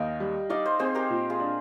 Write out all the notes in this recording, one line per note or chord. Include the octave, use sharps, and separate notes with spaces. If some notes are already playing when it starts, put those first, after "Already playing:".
Already playing: D#2 D#5 F5 G5
G3
D#4 D5 F5
C5 D#5
C4 G#4 C5
G4 A#4
A#2
F4 G#4
D4